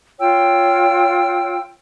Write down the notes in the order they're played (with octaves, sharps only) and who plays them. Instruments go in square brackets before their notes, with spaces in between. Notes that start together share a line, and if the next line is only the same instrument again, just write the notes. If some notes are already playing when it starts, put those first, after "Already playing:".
[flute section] F4 C#5 G5 E6